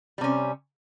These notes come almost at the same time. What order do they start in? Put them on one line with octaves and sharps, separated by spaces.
G3 C3 C#4